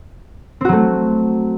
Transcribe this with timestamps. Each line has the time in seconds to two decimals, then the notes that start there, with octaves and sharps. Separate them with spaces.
0.61 C4
0.65 F#4
0.69 F#3
0.73 A3